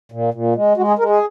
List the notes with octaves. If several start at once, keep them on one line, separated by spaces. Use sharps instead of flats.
A#2
A#2
G#3
G#3 F#4
G#4
G#3 A#4
G#4